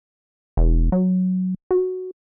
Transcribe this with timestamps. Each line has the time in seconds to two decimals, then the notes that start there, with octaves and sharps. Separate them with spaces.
0.57 E1
0.92 F#3
1.71 F#4